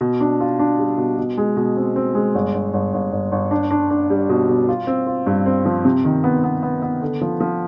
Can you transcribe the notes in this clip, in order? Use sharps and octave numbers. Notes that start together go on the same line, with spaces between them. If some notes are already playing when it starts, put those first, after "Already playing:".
B2
D4
F4
D4
G3
B2
B2
G#3
B2
C4
C4
G#3
G1
G1
G1
G1
G1
G1
D4
D4
D4
G3
B2
B2
F4
C4
F4
G2
C4
F3
C3
D#3
B3
B3
B3
B3
D3
F3
F3